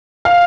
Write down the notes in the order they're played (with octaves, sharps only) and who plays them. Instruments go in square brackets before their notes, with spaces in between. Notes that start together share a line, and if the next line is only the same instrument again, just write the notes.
[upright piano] F5